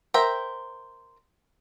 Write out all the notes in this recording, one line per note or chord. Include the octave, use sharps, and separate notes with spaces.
A#4 C5 E5 G5